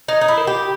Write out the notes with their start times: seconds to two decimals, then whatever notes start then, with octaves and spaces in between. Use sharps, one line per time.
0.08 D#4 D#5
0.21 D#4
0.28 E4
0.38 A#4
0.47 G4